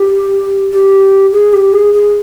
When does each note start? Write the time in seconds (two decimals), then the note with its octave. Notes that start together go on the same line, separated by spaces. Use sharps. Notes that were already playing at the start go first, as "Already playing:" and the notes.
Already playing: G4
0.73 G4
1.32 G#4
1.53 G4
1.73 G#4
1.93 G#4